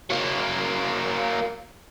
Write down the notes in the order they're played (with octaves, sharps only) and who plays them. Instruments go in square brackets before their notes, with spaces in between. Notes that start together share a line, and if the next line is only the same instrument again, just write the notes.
[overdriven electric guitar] F#3 A#3